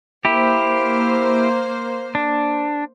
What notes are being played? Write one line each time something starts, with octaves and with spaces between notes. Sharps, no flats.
A#3 E4 G4 C5
D4